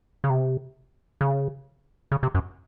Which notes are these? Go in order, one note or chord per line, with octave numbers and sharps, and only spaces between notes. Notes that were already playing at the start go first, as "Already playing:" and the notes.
C#3
C3
C#3
C#3
C3
F#2